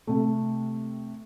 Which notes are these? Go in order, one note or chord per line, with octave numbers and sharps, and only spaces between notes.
C3 A3